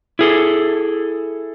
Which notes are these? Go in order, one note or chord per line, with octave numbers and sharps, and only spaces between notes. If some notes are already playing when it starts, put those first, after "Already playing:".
E4 G#4 A4